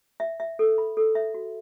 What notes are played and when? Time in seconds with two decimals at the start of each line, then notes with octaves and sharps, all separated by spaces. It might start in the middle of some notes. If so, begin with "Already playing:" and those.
0.20 E5
0.40 E5
0.59 A4
0.78 B5
0.97 A4
1.15 E5
1.34 F#4